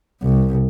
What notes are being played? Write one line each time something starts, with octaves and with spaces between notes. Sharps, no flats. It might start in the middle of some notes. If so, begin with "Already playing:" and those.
C2